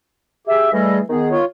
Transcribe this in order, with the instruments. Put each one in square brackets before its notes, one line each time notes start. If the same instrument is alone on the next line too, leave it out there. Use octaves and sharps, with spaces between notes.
[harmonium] G4 G#4 [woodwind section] E5
[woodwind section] E3 G3 A3 [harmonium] G#4 A4 D#5
[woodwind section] D#3 B3 [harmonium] G#4
[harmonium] F4 C#5